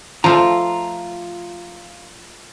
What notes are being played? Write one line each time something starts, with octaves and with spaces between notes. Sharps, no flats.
F3 A3 F4 A#5